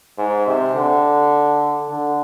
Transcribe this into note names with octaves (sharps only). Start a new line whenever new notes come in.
G#2
C3
D3
D3